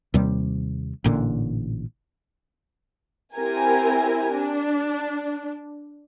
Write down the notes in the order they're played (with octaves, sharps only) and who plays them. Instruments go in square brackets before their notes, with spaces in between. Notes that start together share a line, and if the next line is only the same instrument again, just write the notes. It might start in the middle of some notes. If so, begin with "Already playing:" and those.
[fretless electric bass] D#2 C3 G3
A1 A#2 D3
[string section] C4 E4 G4 A#4 G#5
D4